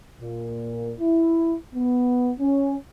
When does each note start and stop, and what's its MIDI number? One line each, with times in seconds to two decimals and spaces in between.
0.22 0.93 46
1.00 1.56 64
1.75 2.31 59
2.40 2.75 61